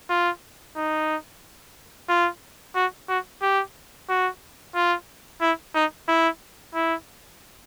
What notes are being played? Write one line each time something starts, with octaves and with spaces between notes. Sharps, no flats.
F4
D#4
F4
F#4
F#4
G4
F#4
F4
E4
D#4
E4
E4